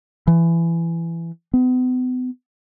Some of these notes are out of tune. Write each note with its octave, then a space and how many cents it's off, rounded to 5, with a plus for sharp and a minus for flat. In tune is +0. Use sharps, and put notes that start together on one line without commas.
E3 +20
B3 +40